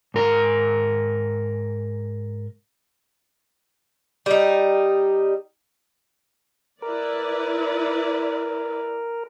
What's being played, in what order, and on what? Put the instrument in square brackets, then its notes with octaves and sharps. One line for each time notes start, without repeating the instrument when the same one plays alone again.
[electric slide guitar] G#2 A#4 A#5
[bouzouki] G3 D#4
[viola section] E4 B4 D5 [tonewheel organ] A#4